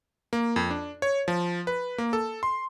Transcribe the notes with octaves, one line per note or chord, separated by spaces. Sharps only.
A#3
F2
D4
C#5
F3
B4
A#3
A4
C6